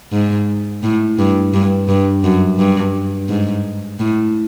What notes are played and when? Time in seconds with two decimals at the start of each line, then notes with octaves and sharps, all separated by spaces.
0.12 G#2
0.83 A2
1.18 G2
1.54 G2
1.88 G2
2.24 F#2
2.58 G2
3.29 G#2
3.99 A2